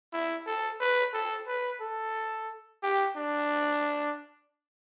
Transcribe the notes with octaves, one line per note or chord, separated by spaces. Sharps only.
E4
A4
B4
A4
B4
A4
G4
D4